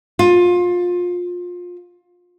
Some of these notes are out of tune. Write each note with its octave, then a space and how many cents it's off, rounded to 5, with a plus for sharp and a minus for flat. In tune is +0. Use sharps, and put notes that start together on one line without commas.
F4 +25